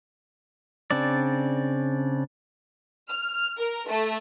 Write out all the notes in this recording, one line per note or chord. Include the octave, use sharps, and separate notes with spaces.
C#3 C4 D4 D5
F6
A#4
A3